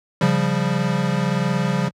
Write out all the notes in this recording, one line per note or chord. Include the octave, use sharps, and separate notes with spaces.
C#3 F3 G3